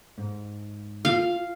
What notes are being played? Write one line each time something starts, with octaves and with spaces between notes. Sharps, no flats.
G#2
F4 F5